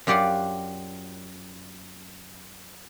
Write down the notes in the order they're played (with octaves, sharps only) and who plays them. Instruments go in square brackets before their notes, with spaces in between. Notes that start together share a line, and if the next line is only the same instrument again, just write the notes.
[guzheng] F#2 F4 G4 D5 F#5 C6